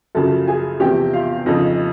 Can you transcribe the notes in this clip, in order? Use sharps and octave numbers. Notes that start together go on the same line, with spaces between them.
F#2 C#3 F3 A4 A5
G#4 G#5
E2 C3 F3 G4 G5
F4 F5
F2 C#3 F3 D#4 D#5